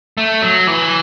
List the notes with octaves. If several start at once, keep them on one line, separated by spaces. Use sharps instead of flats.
A3
F#3
E3